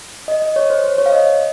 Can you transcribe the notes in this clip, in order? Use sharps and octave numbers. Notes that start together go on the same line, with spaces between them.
D#5
D#5
C#5
C5
C5
C#5
F5
D#5